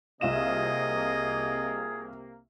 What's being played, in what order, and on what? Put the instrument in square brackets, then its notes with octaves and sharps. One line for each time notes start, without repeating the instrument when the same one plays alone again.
[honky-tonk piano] C2 F4 E7 [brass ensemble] C3 A#3 [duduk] G#4 [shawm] D#5